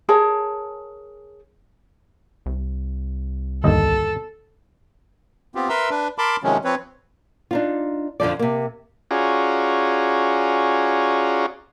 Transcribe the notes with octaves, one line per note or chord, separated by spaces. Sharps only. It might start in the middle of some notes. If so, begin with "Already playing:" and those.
G#4 A#4 C#5 A5
C2
G1 D#2 A4 D#5
B3 C4 F4 G4
A#4 B4 E5 A#5 C6 E6
D4 B4
A#4 A5 B5 C6 D6
C3 D#3 F3 F#3 G#3 C#4
F3 C4 B4 C#5
D4 D#4 F4
F2 D3 D#3 F3 D5
C3 A#3
C#4 F4 F#4 G#4 D5 A#5